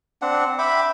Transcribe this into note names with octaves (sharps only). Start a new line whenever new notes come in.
C4 D4 F#5
E5 G5 B5 D6